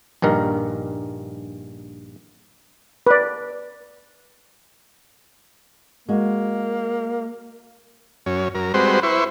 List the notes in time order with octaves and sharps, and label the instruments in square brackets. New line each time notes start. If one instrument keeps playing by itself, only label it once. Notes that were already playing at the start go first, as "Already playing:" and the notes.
[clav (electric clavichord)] A#1 G2 D#3 A#4
[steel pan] B4 D5
[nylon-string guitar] G#3 F#4 [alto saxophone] A#3
[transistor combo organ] F#2 C#4
F#2 A#4
G3 G#3 C4 F#4 B4 C5
E4 B4 C5 C#6